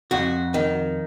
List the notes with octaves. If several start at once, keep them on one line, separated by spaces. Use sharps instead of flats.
F2 F#4
D#3